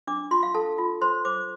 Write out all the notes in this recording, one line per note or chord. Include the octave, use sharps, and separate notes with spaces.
D4 D6
F4 C6
F5
A4 A5
F4
C5 C6
C5 D6